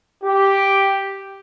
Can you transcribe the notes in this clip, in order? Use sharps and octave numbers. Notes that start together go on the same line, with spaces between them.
G4